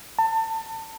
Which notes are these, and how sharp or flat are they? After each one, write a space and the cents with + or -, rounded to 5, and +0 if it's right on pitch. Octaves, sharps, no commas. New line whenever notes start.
A5 +30